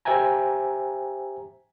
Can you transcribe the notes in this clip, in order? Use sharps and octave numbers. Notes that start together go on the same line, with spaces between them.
G4 C5 E5 G5 G#5 A#5